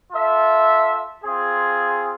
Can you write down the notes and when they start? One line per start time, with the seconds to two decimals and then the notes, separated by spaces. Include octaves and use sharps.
0.11 F4 A4 E5
1.24 C4 F4 G#4